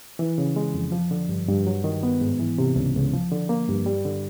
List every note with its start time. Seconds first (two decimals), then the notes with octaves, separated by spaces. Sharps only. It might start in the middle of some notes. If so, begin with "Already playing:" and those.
0.19 E3
0.38 C#3
0.56 G#3
0.74 F2
0.92 F3
1.11 D3
1.29 G2
1.48 G2
1.67 F#3
1.84 D#3
2.03 B3
2.21 G#2
2.39 E3
2.58 C3
2.76 C#2
2.95 C#2
3.14 F3
3.32 D3
3.49 A#3
3.68 G2
3.86 G3
4.06 D3